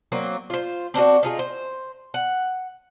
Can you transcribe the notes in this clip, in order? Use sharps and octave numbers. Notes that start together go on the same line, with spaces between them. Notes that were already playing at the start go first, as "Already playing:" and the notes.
F#3 A#3 C4
F4 C5
C4 D4 D#4 F#4
D#4 F4 G#4
C5
F#5